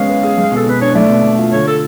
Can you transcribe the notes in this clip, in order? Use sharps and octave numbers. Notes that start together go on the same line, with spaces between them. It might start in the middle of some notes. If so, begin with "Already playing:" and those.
Already playing: G#3 B3 C#4 F5
B4
G#4
G#3
B2 A4
B2 B4
D4 C#5
A3 D5
B2
B2
F4
D3 C#5
A4